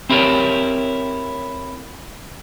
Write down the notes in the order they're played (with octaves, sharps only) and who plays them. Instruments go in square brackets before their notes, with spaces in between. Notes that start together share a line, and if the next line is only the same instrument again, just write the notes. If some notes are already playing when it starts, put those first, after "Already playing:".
[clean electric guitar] C4 E4 G4 A#4 C#5